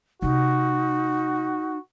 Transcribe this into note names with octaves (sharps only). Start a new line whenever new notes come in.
C3 A3 D#4 F#4